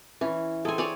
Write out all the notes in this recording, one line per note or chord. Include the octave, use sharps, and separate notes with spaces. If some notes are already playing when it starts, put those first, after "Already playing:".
E3 C#4
C4 G#4 A4 G#5
C#5 D5 G#5